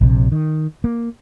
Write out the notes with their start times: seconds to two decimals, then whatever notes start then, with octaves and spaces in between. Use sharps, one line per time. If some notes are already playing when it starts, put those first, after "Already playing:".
0.01 A#1 C3
0.32 D#3
0.84 A#3